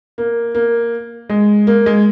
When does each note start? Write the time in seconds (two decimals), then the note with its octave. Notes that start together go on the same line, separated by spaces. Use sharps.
0.18 A#3
0.55 A#3
1.30 G#3
1.67 A#3
1.86 G#3